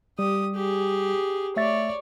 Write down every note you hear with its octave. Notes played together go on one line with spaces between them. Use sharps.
G3 G4 D#6
G4 G#4
A3 C#5 D5 E5 A6